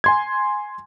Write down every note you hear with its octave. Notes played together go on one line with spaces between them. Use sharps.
G#5 C6 G#6